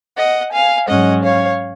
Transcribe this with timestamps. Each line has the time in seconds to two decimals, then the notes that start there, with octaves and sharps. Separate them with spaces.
0.17 D#5 F#5
0.52 F5 G#5
0.88 G#2 F#3 C#4 D#5 F#5
1.23 C#5 F5